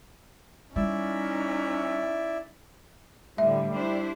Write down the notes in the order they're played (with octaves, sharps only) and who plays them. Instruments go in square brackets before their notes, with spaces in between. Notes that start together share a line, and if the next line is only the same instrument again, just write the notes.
[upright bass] G3 [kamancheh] C#4 D#4 [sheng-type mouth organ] E4 D5 E5
[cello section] A2 D3 [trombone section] G3 [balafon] E5
[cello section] D4 E4 C5